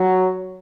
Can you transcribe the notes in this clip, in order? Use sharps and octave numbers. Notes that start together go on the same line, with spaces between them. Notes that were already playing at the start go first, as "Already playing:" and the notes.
Already playing: F#3